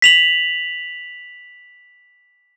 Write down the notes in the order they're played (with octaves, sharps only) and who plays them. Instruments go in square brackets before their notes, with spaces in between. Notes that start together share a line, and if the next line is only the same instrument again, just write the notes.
[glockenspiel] B6 F7 F#7